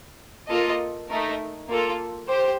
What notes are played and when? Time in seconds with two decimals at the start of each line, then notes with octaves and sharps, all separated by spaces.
0.49 A#3 F4 A4 D#5
1.09 A3 D#4 A#4
1.68 A#3 F4 A4
2.27 G4 C5